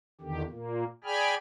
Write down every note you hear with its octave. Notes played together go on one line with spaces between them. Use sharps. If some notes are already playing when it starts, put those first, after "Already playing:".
E2 D3 D#3 G4
A#2 A#3
G#4 D5 G5 G#5 B5 F6